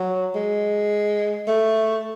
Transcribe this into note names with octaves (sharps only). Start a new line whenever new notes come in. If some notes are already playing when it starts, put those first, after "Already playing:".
Already playing: F#3
G#3
A3